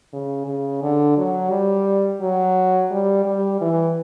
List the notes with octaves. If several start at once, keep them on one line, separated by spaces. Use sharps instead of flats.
C#3
C#3
D3
F#3
G3
F#3
G3
G3
E3